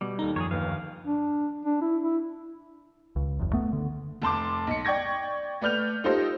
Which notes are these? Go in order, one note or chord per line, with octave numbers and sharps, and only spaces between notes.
B2 G3
D#2 D#4 A4 A#5
F#2 F3 G#4 A#4 C#5
G1 D#2 B4 F5
D4
D4
E4
E4
C#2
F#1 E2
A3 B3
D3
F1 A5 C6 D6
B1 C#7
D5 G5 C#6 G#6 A#6
A3 B4 D5 F6 G6 F7
D#4 F4 G4 A4 C5 D#5